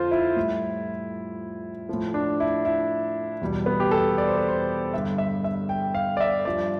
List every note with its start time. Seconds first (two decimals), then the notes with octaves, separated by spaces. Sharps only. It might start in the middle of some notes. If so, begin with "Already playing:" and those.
Already playing: F2 D3 F4 C5
0.11 E4
0.36 A2 G3
1.89 A2 F3
2.14 D4
2.40 E4
2.65 E4
3.42 E2 B2 G3
3.66 B3
3.80 G4
3.91 A4
4.18 D5
4.28 C5
4.38 B4
4.48 C5
4.94 G2 D3 G3 E5
5.18 E5
5.44 E5
5.69 G5
5.95 F5
6.17 D5
6.21 E5
6.45 G2 F3 D5